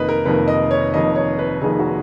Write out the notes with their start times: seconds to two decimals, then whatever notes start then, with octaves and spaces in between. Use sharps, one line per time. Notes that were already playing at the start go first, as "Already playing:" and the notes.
Already playing: F1 F2 D#3 A#3 B4 D#5
0.09 A#4
0.25 F1 F2 D#3 A#3 B4
0.48 D#5
0.71 C#5
0.94 F1 F2 D#3 A#3 D#5
1.16 C#5
1.39 B4
1.61 F1 F2 D#3 A#3 G#4
1.79 F#4